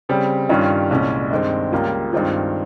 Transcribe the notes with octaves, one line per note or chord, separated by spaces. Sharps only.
C#3 G3 C4
G2 D#3 G3 C#4 F4
C2 A#2 G#3 C#4
G2 D#3 G#3 C4
C#2 C#3 G3 A#3 F4
G2 D#3 G#3 C4 F4